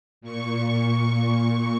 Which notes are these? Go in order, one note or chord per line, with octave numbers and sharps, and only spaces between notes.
A#2 C#6